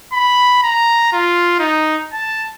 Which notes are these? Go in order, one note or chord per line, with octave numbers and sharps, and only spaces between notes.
B5
A#5
F4
D#4
A5